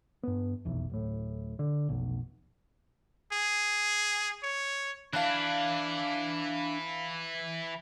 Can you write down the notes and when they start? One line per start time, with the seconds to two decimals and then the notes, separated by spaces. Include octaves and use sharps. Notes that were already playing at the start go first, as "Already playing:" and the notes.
0.23 G2 B3
0.65 F1 B1 E2
0.90 D1 A2
1.59 D3
1.89 F1 B1
3.33 G#4
4.43 C#5
5.13 E3 D4 E4 F5 A5 F#6